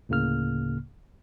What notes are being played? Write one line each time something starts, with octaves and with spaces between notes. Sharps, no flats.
D2 A2 C#3 A#3 F6